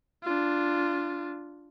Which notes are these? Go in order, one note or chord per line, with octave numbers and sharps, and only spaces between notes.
D4 F4